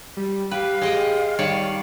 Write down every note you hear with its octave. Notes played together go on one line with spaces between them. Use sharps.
G3
G4 B4 F5
G#3 G4 D#5 G5
D#3 G3 C#5 D5